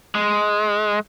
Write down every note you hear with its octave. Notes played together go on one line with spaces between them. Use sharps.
G#3